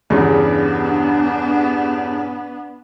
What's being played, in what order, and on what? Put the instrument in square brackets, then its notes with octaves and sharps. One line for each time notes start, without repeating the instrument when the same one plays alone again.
[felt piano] E2 G2 C#3 [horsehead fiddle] B3 D4